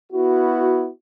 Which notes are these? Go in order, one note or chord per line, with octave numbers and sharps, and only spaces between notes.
B3 E4 F#4